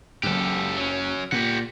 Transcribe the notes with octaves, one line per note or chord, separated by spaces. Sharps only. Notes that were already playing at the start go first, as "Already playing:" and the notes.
F#1 F#2 G4 A4
F#3 C#4
A#2 G4 F#5